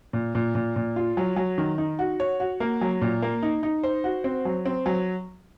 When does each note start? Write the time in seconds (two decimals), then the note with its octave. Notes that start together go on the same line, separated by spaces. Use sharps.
0.13 A#2
0.35 A#2
0.55 A#2
0.76 A#2
0.96 F4
1.17 F#3
1.36 F#3
1.58 D#3
1.78 D#4
1.99 F#4
2.20 C#5
2.40 F#4
2.60 A#3
2.81 F#3
3.01 A#2
3.22 A#3
3.43 D#4
3.63 D#4
3.83 C5
4.04 F#4
4.24 C4
4.45 F#3
4.66 C4
4.86 F#3